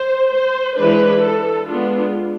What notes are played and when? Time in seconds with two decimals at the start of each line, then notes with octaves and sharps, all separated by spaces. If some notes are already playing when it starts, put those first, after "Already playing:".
Already playing: C5
0.31 C5
0.77 E3 G#3 D4 B4
1.23 A4
1.68 G#3 B3 D4 F4